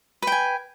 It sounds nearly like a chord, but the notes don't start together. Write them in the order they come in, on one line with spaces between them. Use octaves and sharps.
B4 G5 G#5